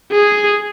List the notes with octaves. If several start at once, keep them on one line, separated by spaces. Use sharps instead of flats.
G#4